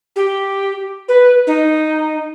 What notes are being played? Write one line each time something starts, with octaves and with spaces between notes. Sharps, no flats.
G4
B4
D#4